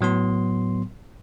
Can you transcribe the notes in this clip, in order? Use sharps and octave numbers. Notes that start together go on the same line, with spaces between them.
A2 F#3 B3 C6